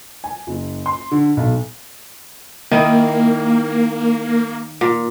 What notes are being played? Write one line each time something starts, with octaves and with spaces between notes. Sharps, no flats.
G#5
F#1
C6
D3
B1
D#3 A#3 D#4 E4
A#2